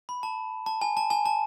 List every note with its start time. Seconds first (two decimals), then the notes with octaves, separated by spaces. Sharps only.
0.09 B5
0.23 A5
0.66 A5
0.82 G#5
0.97 A5
1.10 G#5
1.26 A5